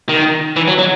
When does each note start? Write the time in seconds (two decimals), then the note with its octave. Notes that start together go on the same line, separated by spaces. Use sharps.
0.09 D#3
0.56 E3
0.68 F#3
0.79 F#3